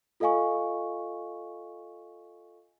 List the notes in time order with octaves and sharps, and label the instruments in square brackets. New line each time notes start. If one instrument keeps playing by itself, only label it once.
[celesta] F4 A4 D#5 F5 G#5 C#6